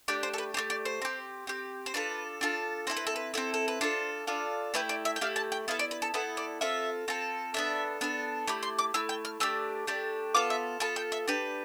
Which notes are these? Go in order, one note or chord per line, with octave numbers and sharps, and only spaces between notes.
A3 D4 G4 D5
C5
A4
B4
A3 D4 G4 C5
D5
C5
C4 G4
C4 G4
C5
D4 F4 A4 B4
D4 F4 A4
C4 E4 A4 C5
B4
A4
B4
C4 E4 A4
A4
B4
D4 F4 A4 C5
D4 F4 A4
A3 E4 G4 B4
D5
E5
G5
A3 E4 G4 F5
A5
G5
B3 E4 A4 F5
D5
B4
A4
B3 E4 A4 B4
D5
C4 F4 A4 E5
C4 F4 A4
B3 D4 A4 E5
B3 D4 A4
A3 E4 G4 B5
C6
D6
A3 E4 E6
G5
F6
A3 D4 G4 E6
A3 D4 G4
B3 F4 A4 D6
E5
B3 F4 A4 A5
G5
E5
D4 G4 B4